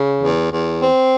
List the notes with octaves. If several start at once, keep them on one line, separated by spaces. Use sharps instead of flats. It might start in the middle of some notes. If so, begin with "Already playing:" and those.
Already playing: C#3
E2
E2
C4